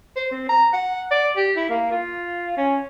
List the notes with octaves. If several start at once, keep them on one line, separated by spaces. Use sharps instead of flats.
C5
C4
A#5
F#5
D5
G4
E4
A#3
F4
C#4